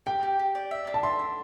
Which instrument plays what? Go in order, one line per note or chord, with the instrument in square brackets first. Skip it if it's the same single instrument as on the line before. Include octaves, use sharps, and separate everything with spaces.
[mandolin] G4 [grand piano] G5
[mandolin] G4
G4
D5
E5
D4
[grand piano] A5
[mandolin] E5 [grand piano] C6
[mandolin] D4